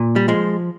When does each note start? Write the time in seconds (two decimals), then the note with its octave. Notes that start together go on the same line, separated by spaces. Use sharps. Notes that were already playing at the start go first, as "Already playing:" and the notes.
Already playing: A#2
0.16 G3
0.28 F3 G#3